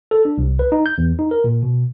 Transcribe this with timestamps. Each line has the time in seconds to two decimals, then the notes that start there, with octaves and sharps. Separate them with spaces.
0.11 A4
0.25 D4
0.38 C2
0.59 B4
0.72 D#4
0.86 G6
0.98 E2
1.19 D#4
1.31 A#4
1.44 A#2
1.63 B2